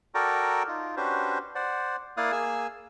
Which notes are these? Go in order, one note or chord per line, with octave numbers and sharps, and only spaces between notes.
F#4 A4 A#4 D5 G5 A#5
D#4 F4
C#4 D4 F#4 G4 B4 C5
C5 D5 F#5
A#3 E4 D5 F5 D#6 F#6
A#3 G#4 G#5 E6